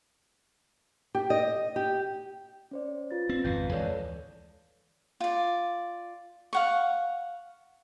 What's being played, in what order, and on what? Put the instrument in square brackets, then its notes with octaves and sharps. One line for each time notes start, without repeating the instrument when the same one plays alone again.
[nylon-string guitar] G4
D#5
G4
[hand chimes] C#4 C5 D5
F4 B4 A6
[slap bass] C4
[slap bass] G#1 F2 B2 [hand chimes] B4 F5 G6
[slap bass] D2 E3 G#3 [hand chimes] A4 C#5 D5
[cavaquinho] F4 D5
F5 F#5 C#6